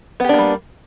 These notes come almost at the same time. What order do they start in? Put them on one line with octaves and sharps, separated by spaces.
B3 G4 D4 A#3 G3